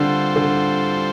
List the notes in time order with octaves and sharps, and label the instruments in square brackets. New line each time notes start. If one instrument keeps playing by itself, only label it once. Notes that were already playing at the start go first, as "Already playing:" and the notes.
Already playing: [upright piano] D3 [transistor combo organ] G3 C4 F4 A4 C5
[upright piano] D3